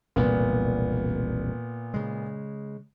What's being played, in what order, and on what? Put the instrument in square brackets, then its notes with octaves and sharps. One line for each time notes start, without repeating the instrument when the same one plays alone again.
[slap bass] E1 C2 F2 [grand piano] A#2 B3
[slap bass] C#3 G#3